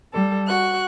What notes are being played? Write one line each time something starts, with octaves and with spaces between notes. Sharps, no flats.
G3 A4
F#4 F#6